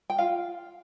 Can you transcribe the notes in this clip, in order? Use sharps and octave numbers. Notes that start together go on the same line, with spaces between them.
G5
F4 F5